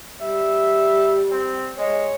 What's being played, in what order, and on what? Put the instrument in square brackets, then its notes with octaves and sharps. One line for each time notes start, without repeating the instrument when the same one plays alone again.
[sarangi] G3 [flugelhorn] E5
[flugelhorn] C4
[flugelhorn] G#3 [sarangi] C#5